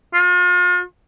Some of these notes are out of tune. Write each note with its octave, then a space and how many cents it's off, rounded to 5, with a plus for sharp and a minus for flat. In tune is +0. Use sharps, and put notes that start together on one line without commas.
F4 +40